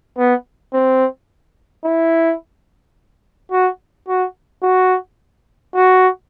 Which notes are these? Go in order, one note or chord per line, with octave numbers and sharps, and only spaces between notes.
B3
C4
E4
F#4
F#4
F#4
F#4